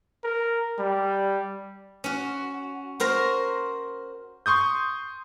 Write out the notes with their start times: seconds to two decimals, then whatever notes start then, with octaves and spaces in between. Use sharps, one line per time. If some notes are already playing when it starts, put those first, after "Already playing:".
0.24 A#4
0.79 G3
2.04 C#4 F#4
3.00 F#4 A#4 C5 A#5
4.46 C6 C#6 D#6 G6